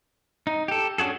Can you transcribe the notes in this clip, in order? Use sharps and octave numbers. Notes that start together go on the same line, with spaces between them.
D#4
G4 A4
C#4 D4 F#4 G#4 A4